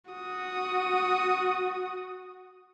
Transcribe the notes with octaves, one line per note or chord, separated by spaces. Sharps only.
F#4 D#6